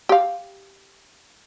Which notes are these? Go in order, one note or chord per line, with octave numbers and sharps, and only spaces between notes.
G4 F5